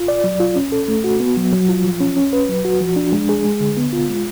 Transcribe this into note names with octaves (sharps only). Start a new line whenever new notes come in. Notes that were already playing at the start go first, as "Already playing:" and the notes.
Already playing: F4
D5
F#3
F4
C#4
A4
A3
F#4
B3
F#3
F#3
F4
F3
C#4
C#4
B4
F#3
F#4
F3
D4
G#3
G#4
G#3
D3
B3
F4
G#3